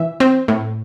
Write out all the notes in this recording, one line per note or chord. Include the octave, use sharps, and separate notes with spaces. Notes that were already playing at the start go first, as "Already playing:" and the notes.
Already playing: E3 E5
C4
A2